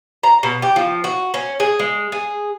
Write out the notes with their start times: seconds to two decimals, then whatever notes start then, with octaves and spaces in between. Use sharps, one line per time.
0.23 A#5
0.43 B2
0.62 G4
0.76 F3
1.04 F#4
1.34 C#4
1.60 G#4
1.79 G#3
2.12 G#4